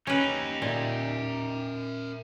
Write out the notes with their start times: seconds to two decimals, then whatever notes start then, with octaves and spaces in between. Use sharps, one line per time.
0.07 C#4 D#4 G4 B4
0.62 A#2 A#4 E5